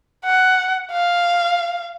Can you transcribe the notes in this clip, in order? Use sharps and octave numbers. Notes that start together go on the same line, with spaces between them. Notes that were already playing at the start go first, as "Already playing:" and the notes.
F#5
F5